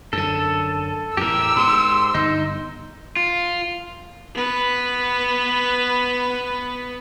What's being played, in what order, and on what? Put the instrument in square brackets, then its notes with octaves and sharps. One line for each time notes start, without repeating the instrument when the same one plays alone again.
[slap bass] F#2 D3 [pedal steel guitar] A4
[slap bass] E2 A2 [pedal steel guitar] G4 A#4 [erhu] E6
[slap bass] G#2 [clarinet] C6
[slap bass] G1 [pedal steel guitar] D#4
[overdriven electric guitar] F4
[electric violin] B3 B4